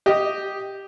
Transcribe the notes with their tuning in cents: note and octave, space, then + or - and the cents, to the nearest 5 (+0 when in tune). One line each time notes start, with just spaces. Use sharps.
G4 +0 D#5 +0